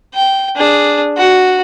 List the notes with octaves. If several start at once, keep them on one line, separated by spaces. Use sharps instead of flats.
G5
D4 G#4
F#4